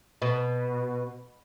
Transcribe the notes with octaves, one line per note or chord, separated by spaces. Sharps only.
B2